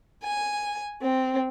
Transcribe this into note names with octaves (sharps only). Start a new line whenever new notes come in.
G#5
C4